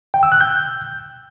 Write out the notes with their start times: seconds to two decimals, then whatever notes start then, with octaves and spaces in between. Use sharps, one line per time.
0.14 G5
0.23 E6
0.32 F#6
0.41 G6